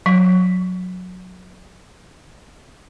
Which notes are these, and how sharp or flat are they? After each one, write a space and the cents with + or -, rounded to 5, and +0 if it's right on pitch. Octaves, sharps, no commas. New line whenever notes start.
F#3 -20